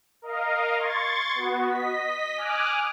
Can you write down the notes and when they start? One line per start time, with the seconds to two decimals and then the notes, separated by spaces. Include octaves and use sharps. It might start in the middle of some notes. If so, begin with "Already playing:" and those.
0.22 A#4 D#5 F5
0.77 C6 C#6 G#6 A6
1.35 B3 F#4
1.69 D#5 B6
2.37 G#5 D6 D#6 F6 F#6